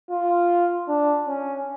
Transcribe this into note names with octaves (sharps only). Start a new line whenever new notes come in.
F4
D4
C#4